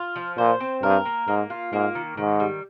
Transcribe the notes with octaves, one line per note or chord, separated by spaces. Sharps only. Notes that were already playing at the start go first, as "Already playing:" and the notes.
Already playing: F4
F3
A#2 C5
C4
G2 A#4
A#3
G#2 A#3
F4
G#2 A#3
D#3
G#2 D#3
G3